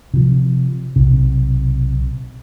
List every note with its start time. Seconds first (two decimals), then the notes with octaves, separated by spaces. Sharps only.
0.13 C3 F3
0.96 B1 C3